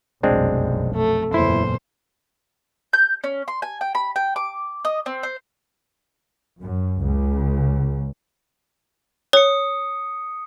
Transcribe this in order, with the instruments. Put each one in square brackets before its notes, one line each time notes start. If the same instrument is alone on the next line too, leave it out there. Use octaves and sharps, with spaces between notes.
[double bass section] F1 B1 F#2 [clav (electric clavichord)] G#3 C4 D4
[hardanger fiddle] A3
[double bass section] F#1 E2 A#2 [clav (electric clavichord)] E4 [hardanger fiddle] C5
[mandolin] G6
C#4
C6
G#5
G5
B5
G5
D6
D#5
C4
C5
[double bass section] F#2
C#2
[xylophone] C#5 [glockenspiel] D#6 C#7